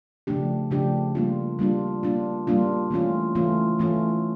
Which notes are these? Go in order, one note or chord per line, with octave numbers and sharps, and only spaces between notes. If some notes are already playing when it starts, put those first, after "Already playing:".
C#3 F3 A3 D4 G4
C#3 F3 A3 D4 G4
G3 A#3 D4 F4
G3 A#3 D4 F4
G3 A#3 D4 F4
G3 A#3 D4 F4
E3 A3 C#4 F4
E3 A3 C#4 F4
E3 A3 C#4 F4